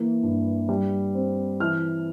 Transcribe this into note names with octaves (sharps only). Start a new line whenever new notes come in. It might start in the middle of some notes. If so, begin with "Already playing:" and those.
Already playing: E3 A#3
G2
G3
C4
E3 F6